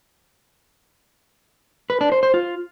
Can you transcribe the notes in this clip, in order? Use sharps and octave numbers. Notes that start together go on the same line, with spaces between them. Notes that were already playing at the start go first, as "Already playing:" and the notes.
B4
D4
C5
C5
F4